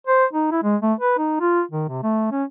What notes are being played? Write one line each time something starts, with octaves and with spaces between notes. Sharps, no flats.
C5
D#4
E4
G#3
A3
B4
D#4
F4
D#3
C3
A3
C#4